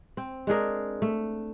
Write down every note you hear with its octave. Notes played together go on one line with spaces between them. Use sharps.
C4
G#3 D4 G#4 A#4
A3